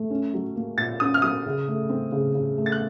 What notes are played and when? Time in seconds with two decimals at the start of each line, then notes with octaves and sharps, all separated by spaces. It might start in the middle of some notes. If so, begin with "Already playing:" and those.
Already playing: A3
0.10 C#4
0.34 F#3
0.56 A#3
0.78 A#2 A6
1.00 C#4 D#6
1.14 F6
1.22 F#3 D#6
1.46 C#3
1.68 A3
1.89 C4
2.12 C#3
2.35 C#3
2.58 A3
2.66 A6
2.72 F#6